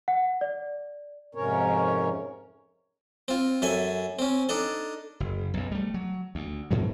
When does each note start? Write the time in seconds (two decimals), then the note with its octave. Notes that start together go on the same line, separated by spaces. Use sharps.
0.08 F#5
0.41 D5
1.35 F2 G#2 C3 C#4 A#4 C#5
3.28 C4 F4
3.62 F#2 A4 E5 G#5
4.19 C4 C#4
4.49 D4 D#4 A4
5.20 F#1
5.54 B1 F#2
5.72 G3 A3
5.94 F#3
6.35 D2
6.71 G#2 B2 F#3